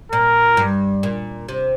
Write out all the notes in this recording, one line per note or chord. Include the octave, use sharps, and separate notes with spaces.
A#2 A#4
G2
A#2
C3